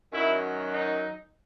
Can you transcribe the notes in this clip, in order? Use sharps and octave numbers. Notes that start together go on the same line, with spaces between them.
F#2 D#3 F#3 E4
D#4